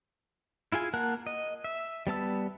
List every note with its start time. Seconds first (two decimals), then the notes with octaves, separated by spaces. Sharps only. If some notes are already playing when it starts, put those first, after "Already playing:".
0.72 E4 F4 G#4 G#5
0.94 A#3 A#4 F#5 A5 F#6
1.27 D#5
1.64 E5
2.07 G3 B3 A5 E6